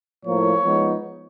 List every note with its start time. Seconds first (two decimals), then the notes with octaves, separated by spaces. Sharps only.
0.23 A2 F3 A#3 C#5
0.62 F3 G#3 B3 D#4